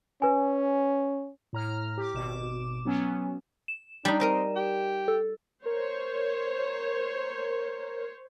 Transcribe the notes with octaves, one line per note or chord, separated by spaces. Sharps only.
C#4 B4 G#5
A2 A#5 F6
G4 D6
G#1 B2 D6 E7
F#3 B3 C#4
E7
G3 D4 D#4
C4 D#4 A#4 D#5
G4
A4
A#4 C5 C#5